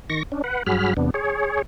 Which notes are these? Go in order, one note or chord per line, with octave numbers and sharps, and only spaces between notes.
D#3 C#6 A#6
C#4 D4
B4 F#5
G2 F#3 F#4 G#4 B5 F6
E2 C3 B3 D4
G#4 C#5